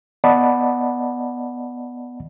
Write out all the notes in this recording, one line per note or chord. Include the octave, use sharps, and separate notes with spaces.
B3 D5 D#5 F#5 A5 B5